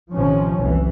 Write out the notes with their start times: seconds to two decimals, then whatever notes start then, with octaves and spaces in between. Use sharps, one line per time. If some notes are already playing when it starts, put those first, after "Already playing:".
0.12 A1 C3 D#3 F3 C#4
0.59 F#1 C2 F2 E3